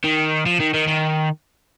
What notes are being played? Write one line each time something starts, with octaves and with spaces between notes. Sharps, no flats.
D#3
F3
D#3
D#3
D#3